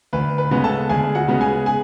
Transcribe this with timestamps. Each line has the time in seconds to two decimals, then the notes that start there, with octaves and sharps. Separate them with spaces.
0.13 D2 B4
0.38 B4
0.51 C#3 G#3 B3
0.64 A4 A5
0.89 D2 G#4 G#5
1.15 F#4 F#5
1.28 C#3 G#3 B3
1.40 G#4 G#5
1.66 G#4 G#5